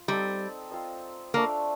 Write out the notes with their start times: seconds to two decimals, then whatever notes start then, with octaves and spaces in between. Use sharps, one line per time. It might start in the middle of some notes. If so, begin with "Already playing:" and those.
Already playing: F4
0.08 G3 C4 D#4 A4
0.71 C4 F4 C5 D#5
1.34 A3 A#3 D4 F4